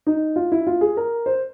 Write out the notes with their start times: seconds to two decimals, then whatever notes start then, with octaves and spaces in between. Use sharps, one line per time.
0.07 D#4
0.36 F4
0.52 E4
0.67 F4
0.81 G#4
0.97 A#4
1.26 C5